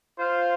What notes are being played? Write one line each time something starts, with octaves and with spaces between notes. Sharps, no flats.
F4 C5 F5